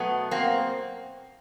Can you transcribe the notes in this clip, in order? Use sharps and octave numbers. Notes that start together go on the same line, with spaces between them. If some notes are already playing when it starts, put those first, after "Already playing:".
Already playing: B2 F#3 A3 B3
A#3 C4